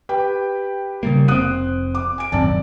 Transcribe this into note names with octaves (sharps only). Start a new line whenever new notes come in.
G4 B4 G5
C#3 G3 A#3
F1 C4 D#6 F#6 D#7
D6
G#5 D7
D#1 G#1 F#2 C4 D5 A5